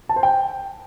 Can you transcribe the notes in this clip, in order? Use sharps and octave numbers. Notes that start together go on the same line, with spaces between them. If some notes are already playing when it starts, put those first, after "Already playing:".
A5
C5
G5